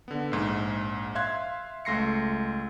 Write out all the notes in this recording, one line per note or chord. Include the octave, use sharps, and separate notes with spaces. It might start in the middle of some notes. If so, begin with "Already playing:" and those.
D3 B3
A#1 G#2
E5 F5 C6 F#6 G#6
C#2 A3 C6 A#6 C7 C#7